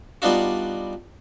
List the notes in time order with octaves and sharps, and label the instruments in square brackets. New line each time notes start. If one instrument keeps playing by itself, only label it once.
[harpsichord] G3 B3 D4 D#4 F4 F#4